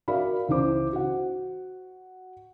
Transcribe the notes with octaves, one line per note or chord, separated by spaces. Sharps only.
F#4 A#4 D5 E5 F5 B5
C#2 E3 C5 D6
F#4 C5 F#5